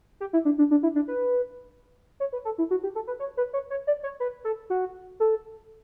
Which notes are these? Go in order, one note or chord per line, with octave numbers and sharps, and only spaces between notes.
G4
E4
D4
D4
D4
E4
D4
B4
C#5
B4
A4
E4
F#4
G4
A4
B4
C#5
B4
C#5
C#5
D5
C#5
B4
A4
F#4
A4